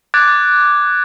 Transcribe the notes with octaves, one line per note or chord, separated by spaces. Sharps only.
D6 F#6 G#6 A6 D7